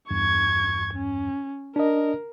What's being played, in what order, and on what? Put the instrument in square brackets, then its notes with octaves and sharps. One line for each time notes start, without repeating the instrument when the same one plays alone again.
[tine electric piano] E2 G2 [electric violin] C#6 G#6
[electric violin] C#4
[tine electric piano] D4 D#5 [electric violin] A#4